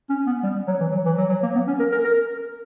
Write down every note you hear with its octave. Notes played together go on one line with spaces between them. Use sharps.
C#4
B3
G3
F#3
E3
F#3
E3
F#3
F#3
A#3
B3
C#4
A#4
A#4
A#4